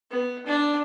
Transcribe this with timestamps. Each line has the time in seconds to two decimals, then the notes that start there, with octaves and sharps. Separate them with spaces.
0.11 B3
0.46 D4